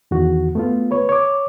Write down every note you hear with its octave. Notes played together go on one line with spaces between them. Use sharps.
E2 D#3 F#4
A3 B3 F4
B4 C#5
C#5 D6